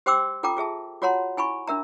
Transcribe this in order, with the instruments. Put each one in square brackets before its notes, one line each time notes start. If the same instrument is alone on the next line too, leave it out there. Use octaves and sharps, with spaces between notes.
[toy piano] G4 C5 G5 C6 D6 E6
F4 A4 G5 A#5 D6
F4 G#4 E5 A5
F4 F#4 C#5 F#5 A#5 C6
E4 G#5 B5 C#6
D4 A#4 E5 A#5